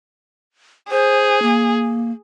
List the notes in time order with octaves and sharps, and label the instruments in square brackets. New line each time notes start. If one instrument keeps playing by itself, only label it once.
[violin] G#4 [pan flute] C5
[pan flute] A#3